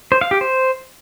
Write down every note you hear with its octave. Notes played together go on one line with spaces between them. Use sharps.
C5
F5
G4
C5